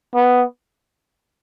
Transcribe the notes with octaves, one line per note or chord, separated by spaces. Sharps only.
B3